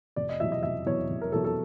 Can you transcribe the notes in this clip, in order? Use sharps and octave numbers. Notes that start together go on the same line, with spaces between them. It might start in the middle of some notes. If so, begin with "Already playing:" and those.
F1 D5
D#5
E2 B2 F#3 E5
D#5
F1 E5
E2 B2 F#3 C#5
F1
A#4
E2 B2 F#3 A4
A4